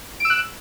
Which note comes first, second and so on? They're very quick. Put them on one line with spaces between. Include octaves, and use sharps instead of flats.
D7 E6 F#6